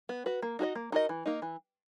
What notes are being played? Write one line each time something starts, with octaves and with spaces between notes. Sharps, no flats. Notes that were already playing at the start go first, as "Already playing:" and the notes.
B3
F#4 B4
A#3
D#4 F#4 A#4 D#5
A#3
D#4 F#4 A#4 D#5
E3
A#3 D#4
E3